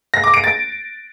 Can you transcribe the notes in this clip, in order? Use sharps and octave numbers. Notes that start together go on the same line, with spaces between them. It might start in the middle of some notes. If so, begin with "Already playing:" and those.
A#6
D6
D7
A6